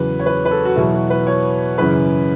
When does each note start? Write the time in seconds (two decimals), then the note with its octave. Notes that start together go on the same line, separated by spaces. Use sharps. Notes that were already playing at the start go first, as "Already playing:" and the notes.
Already playing: E2 C#3 F#3 B4
0.20 C#5
0.26 B4
0.45 B4
0.51 A4
0.65 F#4
0.76 E2 B2 F#3 E4
0.94 F#4
1.10 B4
1.27 C#5
1.78 F#2 C#3 E3 B4